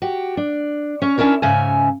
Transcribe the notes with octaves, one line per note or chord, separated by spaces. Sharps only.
F#4 G4
D4
C#4 C#5
C#4 D4 E4 A#4 C#5
G#2 C#3 C#4 E5 G#5